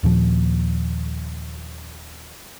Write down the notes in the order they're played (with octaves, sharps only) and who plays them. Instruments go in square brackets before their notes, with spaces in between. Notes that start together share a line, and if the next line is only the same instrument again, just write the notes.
[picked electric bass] D#2 A#2 F3